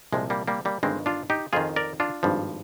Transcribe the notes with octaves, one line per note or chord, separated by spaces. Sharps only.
C2 A#2 F3 G#3
G3 A#3
G3 A#3
G3 A#3
G1 G2 D#3 G#3 C4
D4 F4
D#4 G4
F2 D#3 F4 G#4
A#4 D5
D4 F4
G#1 G2 F3